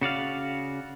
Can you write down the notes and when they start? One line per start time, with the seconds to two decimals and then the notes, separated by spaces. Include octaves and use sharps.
0.01 C#3 F#4 D5 F5